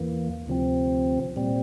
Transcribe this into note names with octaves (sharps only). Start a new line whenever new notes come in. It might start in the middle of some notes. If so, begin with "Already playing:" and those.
Already playing: E2 E3 A#3
D2 C3 F3 C4
A#2 G3 C4